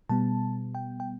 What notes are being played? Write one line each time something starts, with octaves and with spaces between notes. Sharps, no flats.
B2 G3 B3 A5
G5
G5